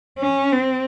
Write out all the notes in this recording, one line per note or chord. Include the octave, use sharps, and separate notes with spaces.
C#4
C4